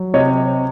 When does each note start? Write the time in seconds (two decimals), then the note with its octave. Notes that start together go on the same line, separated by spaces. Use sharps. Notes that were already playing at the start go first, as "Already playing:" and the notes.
Already playing: F#3
0.14 C3 C#5 D#5